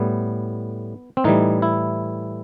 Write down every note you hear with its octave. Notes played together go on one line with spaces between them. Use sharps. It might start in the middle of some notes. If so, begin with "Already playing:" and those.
Already playing: A2 G3 B3
C4
A2 E3 G3 D#4
E4